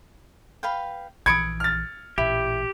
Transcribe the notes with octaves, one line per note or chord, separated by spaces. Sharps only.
B4 F5 G5
A#1 E3 B5 C6 D#6 G#6 C#7 D7
F6 A6
A1 A#2 E4 G4